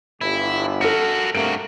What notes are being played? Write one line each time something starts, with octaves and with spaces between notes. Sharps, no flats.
G1 E4
F#4 A4 A#4 C#7
G2 C3 A3 A#3 F#4 D7